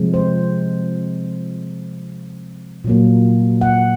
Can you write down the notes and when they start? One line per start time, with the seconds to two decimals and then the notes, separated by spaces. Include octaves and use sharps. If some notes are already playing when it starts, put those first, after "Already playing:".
Already playing: C3 F3 G#3
0.14 C5
2.84 A#2 F#3 A#3
3.61 F#5